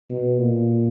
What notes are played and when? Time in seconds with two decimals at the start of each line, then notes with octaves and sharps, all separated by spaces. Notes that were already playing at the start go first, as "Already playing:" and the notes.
0.10 B2
0.39 A#2